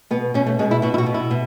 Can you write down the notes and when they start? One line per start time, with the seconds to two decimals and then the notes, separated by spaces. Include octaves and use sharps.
0.11 B2 B3
0.34 B2 C#4
0.46 A3
0.59 B2 G#3
0.71 E4
0.82 B2 F#4
0.94 E4
0.98 F#4
1.06 B2
1.14 E4
1.31 B2